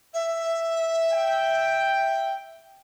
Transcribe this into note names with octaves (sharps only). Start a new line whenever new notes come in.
E5
G5